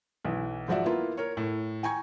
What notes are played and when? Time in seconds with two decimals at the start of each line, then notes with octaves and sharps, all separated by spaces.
0.24 B1 E3
0.68 G#2 F3 F#4 D5 E5
0.86 A#3 B3 E4 F4
1.17 A#4 C#5
1.37 A2
1.83 G5 G#5 A#5 C#6 G#6